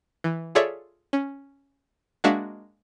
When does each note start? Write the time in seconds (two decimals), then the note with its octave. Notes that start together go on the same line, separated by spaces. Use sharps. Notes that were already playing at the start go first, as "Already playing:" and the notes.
0.24 E3
0.55 F4 G#4 A4 C#5 D5 E5
1.13 C#4
2.24 G#3 A#3 D4 F#4 E5 F5